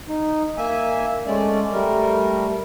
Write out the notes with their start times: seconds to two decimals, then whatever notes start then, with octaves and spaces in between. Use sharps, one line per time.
0.08 D#4
0.57 A#3 E5 G#5
1.26 G#3 A3 C#4 D5
1.72 G3 A3 A#4